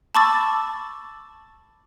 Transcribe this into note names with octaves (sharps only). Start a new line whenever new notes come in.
A5 B5 C#6 D6 E6 A6